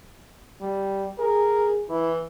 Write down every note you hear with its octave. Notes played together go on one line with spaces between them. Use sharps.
G3
G#4 A#4
E3 E4